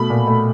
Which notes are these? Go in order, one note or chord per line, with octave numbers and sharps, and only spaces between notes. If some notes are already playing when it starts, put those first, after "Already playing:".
Already playing: B2 A3 B5
A#2
A3